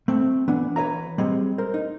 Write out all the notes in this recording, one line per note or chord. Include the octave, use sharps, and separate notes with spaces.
A3 C4
E3 B3 D4
E3 B4 C#5 E5 A#5
G3 G#3 C4
A#4 C5
D#4